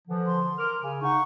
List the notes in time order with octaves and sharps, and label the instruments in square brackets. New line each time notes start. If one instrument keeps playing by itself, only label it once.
[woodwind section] D3 E3 F3
[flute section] C6
[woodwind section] A#4 D6 F6
[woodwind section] C#3 [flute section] G#5
[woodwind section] D#4 [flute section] F#5 C#6